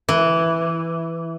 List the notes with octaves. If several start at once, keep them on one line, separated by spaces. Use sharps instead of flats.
E3